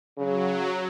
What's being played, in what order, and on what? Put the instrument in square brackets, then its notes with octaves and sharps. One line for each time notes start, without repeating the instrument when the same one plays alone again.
[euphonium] C#3 [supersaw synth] F#3